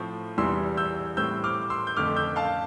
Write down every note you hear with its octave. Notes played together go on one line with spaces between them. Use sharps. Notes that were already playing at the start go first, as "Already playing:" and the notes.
Already playing: A2 F3 A3 C4
E2 C3 E3 G3 C6 E6
E6 G6
A2 G3 C4 E6 G6
D6 F6
C6 E6
G6
F2 D3 A3 D6 F6
E6 G6
F5 A5